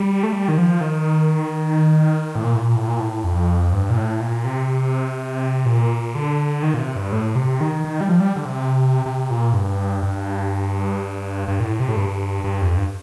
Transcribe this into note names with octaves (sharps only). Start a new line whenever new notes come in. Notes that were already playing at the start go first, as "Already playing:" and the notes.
Already playing: G3
A3
G3
D#3
F3
D#3
A2
A#2
A2
A#2
A2
A#2
A2
F2
G2
A#2
A2
A#2
C3
A#2
D3
D#3
A#2
C3
G2
A2
C3
D#3
D#3
G3
F3
G3
D3
C3
C3
A#2
G2
G2
G2
A#2
A2
C3
A2
G2
G2
F2
G2